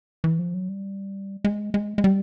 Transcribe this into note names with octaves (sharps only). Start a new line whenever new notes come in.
E3
F3
F#3
G3
G#3
G#3
G#3
G3